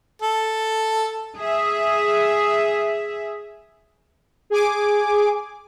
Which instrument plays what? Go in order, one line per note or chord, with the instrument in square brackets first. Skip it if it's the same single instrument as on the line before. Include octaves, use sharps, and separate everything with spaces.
[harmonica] A4
[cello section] G#4 E5
[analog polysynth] G#4 G#5 D6